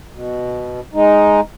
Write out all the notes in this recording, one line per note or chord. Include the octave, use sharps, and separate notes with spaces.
B2
G#3 D#4